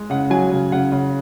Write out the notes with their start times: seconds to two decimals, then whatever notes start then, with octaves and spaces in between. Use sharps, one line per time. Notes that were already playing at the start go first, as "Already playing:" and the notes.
Already playing: G#3
0.10 C#3 F#5
0.30 F#3 G#5
0.52 C#3
0.72 C#3 F#5
0.92 C#3